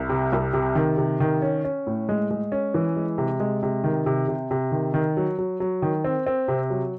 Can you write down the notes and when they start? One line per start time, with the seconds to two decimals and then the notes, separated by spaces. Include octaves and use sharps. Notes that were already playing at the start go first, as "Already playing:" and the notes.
Already playing: C2
0.09 C3
0.33 C2
0.54 C3
0.75 D#3
0.98 C3
1.20 D#3
1.42 C#4
1.65 C#4
1.87 A2
2.09 G#3
2.31 G#3
2.52 C#4
2.74 E3
2.97 G#3
3.18 C3
3.40 G#3
3.63 C3
3.84 D#3
4.06 C3
4.28 C3
4.51 C3
4.72 D#3
4.94 D#3
5.17 F#3
5.39 F#3
5.60 F#3
5.82 D#3
6.04 C4
6.26 C4
6.48 C3
6.70 F#3